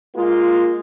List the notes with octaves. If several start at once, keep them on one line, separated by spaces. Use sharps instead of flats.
G#3 A#3 F4